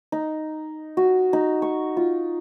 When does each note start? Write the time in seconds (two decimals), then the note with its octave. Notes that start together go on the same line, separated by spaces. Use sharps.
0.12 D#4
0.97 F#4
1.33 D#4
1.62 C#6
1.97 F4